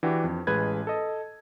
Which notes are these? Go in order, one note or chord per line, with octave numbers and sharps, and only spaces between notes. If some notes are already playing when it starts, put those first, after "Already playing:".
E3 D4 F#4 G4
F2
A1 G#3 B4 G#6
A4 D#5